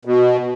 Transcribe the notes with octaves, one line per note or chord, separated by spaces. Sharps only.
B2